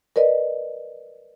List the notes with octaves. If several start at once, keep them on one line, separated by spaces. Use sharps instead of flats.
A#4 B4 D5 D#5